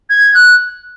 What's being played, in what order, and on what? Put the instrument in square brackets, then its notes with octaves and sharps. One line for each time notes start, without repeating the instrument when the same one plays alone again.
[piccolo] G#6
F#6